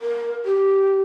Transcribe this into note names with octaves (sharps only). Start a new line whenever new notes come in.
A#4
G4